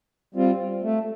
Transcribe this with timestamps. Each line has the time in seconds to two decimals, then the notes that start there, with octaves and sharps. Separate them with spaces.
0.35 G3 C4 F4
0.82 A3